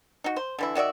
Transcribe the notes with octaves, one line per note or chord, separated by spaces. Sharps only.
D#4 F#4
C5
D3 E3 E4
D#3 F#4 D5 E5